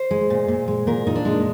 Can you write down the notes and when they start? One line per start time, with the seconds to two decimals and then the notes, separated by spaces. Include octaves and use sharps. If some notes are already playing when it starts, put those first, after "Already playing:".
Already playing: C5
0.11 G#3
0.30 A#2
0.48 A#2
0.68 G#3
0.87 A#2 A#4
1.07 A#2 D#4
1.15 D4
1.25 G#3